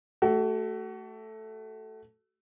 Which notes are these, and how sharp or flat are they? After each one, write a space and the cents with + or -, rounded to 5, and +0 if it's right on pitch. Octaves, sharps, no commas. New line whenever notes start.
A3 +0 F#4 +35